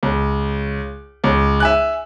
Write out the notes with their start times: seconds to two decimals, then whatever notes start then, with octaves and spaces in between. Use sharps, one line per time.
0.03 C#2
1.24 C#2
1.60 E5 G#5 F#6